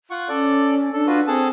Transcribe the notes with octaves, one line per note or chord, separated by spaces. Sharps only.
F4 F#5 C#6
C#4 A4 D5
D4 A4
F4 F#4 B4
C4 G#4 A4 A5